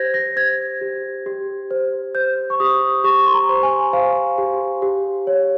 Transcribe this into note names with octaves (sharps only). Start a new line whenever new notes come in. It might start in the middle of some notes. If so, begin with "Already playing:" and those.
Already playing: G4 C5 G6 G#6 A#6
A#6
C5 G#6
G4
G4
C5
C5 G6
C#6
G4 D#6
G4 C#6
C6
A#5
C5
G#5
C5 F5
G4
G4
C#5